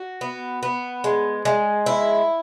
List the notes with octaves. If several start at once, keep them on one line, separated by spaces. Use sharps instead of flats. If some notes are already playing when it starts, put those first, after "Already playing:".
Already playing: F#4
B3
B3
G#3
G#3
E4